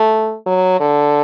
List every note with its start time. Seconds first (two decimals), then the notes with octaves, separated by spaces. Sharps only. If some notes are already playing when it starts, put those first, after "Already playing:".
Already playing: A3
0.46 F#3
0.80 D3